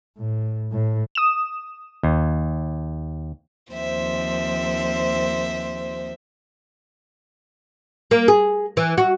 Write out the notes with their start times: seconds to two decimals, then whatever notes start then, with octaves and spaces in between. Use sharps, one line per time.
0.18 A2
0.72 A2
1.15 D#6 E7
2.03 D#2
3.73 D#2 F3 C4 C5 E5
8.11 A#3
8.28 G#4
8.77 E3
8.97 F#4